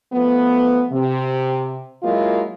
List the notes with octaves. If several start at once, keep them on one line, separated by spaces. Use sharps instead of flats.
F3 A3 B3
C3
F#3 G#3 A#3 E4 F4